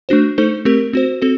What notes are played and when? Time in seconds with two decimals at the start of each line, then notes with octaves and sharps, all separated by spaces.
0.09 A3 D4 F#4 C5
0.38 A3 D#4 A4 C5
0.65 A3 C4 G4 A#4
0.93 C4 F#4 C5
1.22 C4 F#4 A4